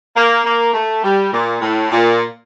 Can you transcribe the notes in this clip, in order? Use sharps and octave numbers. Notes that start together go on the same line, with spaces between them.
A#3
A#3
A3
G3
A#2
A2
A#2